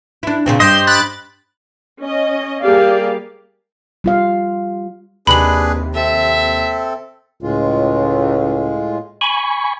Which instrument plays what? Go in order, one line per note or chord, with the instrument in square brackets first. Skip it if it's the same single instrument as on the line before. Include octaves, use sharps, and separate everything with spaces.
[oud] D4 E4
A#2 C#3 C4
[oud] G2 [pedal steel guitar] G4 C5 D#5 [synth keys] C6 G6
[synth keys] B5 F#6 A6
[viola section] C#4 D#5
G3 A#3 G4 G#4 D5 F5
[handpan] G3 F4 F5
[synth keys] D#2 C3 [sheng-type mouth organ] D4 G#4 B4 [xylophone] B5 F#7
[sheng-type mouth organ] C4 A4 [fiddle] E5
[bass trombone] C#2 [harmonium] A2 G#3 F4
[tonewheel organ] G#5 B5 C#6